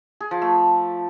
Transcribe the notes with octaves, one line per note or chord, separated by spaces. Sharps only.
G#4
F3
A3